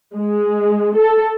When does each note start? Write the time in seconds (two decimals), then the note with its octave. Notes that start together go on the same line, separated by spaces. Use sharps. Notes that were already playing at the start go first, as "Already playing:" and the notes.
0.15 G#3
0.96 A4